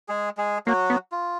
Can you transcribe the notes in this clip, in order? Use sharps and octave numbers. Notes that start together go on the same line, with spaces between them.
G#3 G#4
G#3 G#4
F#3 A#3 F#4
B3
F4